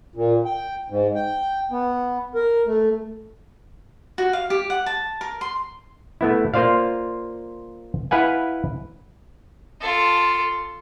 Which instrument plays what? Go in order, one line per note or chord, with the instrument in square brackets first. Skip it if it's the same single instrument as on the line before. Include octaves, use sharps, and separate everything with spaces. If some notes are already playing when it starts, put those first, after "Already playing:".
[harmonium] A#2
G5
G#2
G5
B3
A#4
A3
[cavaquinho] F#4
F5
G4
F#5
A5
A#4
C6
[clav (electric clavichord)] A3 B3 E4
A#3 F4 C5 D5 F5
E4 B4 F5 F#5 G#5
[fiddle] F4 A4